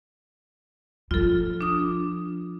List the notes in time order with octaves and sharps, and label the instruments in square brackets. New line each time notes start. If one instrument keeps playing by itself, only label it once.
[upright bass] F3 [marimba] F4 A4
[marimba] D4 D#6